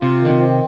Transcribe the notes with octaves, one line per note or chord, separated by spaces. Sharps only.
C3 F4
D3 D#3
C3
C4